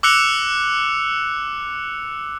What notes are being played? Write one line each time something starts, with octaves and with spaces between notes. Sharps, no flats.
D6 E6 F#6 C#7 F7